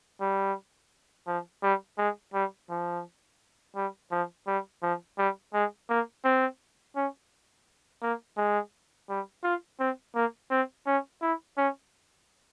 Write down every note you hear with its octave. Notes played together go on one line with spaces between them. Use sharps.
G3
F3
G3
G#3
G3
F3
G3
F3
G3
F3
G3
G#3
A#3
C4
C#4
A#3
G#3
G3
F4
C4
A#3
C4
C#4
E4
C#4